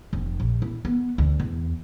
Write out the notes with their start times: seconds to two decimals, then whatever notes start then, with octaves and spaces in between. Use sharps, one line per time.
0.13 F1
0.40 A#1
0.62 E4
0.85 B3
1.18 D2
1.40 E2